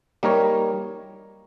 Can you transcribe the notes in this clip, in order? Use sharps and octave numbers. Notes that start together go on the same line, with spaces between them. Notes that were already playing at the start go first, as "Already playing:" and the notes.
G3 A#3 D#4 A#4 C#5